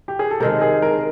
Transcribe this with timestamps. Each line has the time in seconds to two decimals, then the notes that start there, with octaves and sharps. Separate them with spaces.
0.08 G4
0.19 G#4
0.31 A4
0.40 C3 D#3 G#3 A#4
0.62 G#4
0.82 A#4